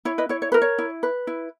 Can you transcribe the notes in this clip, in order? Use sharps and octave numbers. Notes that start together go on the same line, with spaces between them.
E4 C#5
B4 D#5
E4 C#5
C#5
A#4 B4
C#5
E4
B4
E4